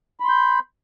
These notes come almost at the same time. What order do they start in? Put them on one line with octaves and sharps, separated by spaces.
B5 C6 G6